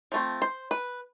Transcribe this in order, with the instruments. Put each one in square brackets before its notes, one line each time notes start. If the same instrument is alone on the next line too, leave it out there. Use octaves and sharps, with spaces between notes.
[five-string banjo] F3 A3 C4
C5
B4